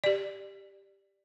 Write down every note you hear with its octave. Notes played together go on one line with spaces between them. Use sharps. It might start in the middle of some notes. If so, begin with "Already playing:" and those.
G4 D5